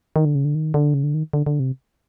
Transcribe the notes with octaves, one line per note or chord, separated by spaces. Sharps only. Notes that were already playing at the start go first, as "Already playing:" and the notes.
D#3
D3
C#3
D3
D#3
D3
C#3
D3
D#3
D3
D3
C3